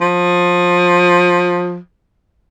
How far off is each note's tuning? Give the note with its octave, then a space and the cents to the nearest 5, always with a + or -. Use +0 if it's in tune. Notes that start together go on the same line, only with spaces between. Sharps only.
F3 +20